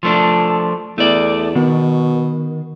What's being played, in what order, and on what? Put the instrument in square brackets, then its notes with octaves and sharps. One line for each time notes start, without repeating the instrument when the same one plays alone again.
[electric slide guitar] F3 A3 D4
[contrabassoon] E2 [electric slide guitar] A3 D5
[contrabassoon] B2 [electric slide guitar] D#3